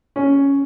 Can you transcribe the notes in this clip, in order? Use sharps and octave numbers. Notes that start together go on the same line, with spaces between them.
C#4